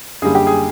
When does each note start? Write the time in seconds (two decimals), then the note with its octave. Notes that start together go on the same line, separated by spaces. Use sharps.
0.22 F#2 D3 G3 A#3 G#4
0.35 G4
0.47 G#4